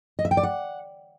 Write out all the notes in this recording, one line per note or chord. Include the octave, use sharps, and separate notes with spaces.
D#5
E5
G5
D5
F#5